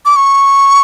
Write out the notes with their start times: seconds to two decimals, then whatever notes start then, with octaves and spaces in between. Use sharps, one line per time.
0.05 D6
0.16 C#6